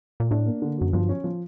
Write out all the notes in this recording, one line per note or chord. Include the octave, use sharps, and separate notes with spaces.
A#2
A2 D4
A#3
D3
F#2 F#3
G2 F3
C#4
F3